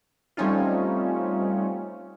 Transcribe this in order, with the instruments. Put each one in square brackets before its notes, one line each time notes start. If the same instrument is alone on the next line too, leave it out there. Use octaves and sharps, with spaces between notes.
[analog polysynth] G3 A3 C4 C#4 D#4 F4